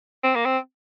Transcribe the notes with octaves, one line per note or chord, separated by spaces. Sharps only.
C4
A#3
C4